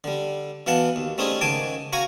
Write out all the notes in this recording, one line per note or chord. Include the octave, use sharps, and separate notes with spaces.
D3 G3
B2 E3 F5 F#5 A5
D#2
G3 A3 C4 C#4 D#4 G#4
C#2 G#2 D#3 G#5 A5 D6
F#4 F5 G#5 A#5 C#6